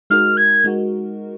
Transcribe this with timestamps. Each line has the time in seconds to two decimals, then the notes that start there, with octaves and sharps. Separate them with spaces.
0.10 G#3 D#4 F#4 A#4 F6
0.37 G#6
0.64 G#3 D#4 F#4